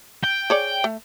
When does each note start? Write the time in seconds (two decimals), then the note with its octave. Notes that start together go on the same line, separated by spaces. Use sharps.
0.24 G5
0.50 G#4 C#5 D5
0.84 A3